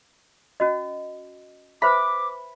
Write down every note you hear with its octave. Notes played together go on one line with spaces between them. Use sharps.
C#4 F#4 D#5
B4 C5 E5 B5 D6